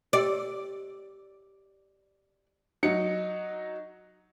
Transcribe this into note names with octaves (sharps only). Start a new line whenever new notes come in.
G4 D5 G5 E6
F#3 D#4 C#7